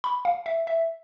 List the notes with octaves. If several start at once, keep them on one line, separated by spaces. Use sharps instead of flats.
B5
F5
E5
E5